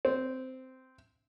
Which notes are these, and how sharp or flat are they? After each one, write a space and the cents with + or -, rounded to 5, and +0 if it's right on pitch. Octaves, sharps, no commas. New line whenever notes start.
C4 -10